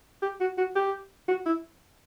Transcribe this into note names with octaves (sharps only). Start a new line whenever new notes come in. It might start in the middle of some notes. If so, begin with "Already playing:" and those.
G4
F#4
F#4
G4
F#4
E4